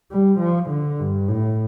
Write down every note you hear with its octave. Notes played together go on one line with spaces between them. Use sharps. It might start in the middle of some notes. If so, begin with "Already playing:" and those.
G3
F3
D3
G2
A2